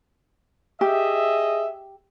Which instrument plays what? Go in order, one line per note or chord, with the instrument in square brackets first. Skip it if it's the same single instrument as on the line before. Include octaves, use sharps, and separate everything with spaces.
[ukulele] G4 [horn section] G#4 D#5 E5